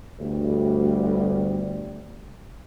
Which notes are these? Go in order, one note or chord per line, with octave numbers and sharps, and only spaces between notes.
G1 D2 G3